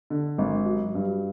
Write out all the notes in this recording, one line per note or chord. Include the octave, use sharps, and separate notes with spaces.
D3
G#1
F#3
G2